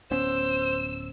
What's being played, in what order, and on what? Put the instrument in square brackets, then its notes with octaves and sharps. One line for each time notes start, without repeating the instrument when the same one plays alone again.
[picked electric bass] D1 B3 C#4 [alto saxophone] C5 [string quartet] E6